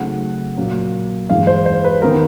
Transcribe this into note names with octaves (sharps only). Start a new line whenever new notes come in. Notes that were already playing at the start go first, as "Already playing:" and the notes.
Already playing: C#3 F#3 A3 C4 D#4 F#5
A#2 F#3 A#3 C#4
G2 E3 G#3 F5
C5
C5
B4
D#3 G3 B3 A#4